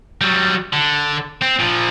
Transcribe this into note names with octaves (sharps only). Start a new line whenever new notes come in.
F#3 G3
D3
C4
A#2 F3